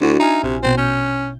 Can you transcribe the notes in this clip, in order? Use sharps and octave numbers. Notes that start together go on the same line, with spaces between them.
D2 D4 E4 F#4
D#4 E5 G#5 F6
A#1 C3
A#1 B2 C4
C#4 G6